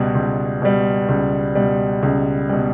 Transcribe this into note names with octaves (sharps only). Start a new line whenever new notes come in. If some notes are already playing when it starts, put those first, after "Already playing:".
Already playing: C#2 B2 G3
C#2
B2 G3
C#2
B2 G3
C#2
B2 G3